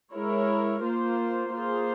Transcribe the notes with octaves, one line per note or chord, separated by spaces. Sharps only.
G#3 E4 A#4 C#5
A#3 F4 C5
A#3 F4 G#4 C5